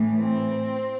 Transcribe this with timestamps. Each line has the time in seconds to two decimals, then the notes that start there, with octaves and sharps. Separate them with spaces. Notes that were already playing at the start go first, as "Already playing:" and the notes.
Already playing: A2 E3 A3
0.17 C4